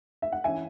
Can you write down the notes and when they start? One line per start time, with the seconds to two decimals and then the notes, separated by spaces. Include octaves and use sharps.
0.22 E5
0.32 F#5
0.44 E3 C#4 E5 G#5